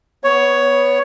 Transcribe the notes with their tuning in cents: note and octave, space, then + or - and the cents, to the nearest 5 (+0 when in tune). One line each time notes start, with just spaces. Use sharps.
B3 +0 C#5 +10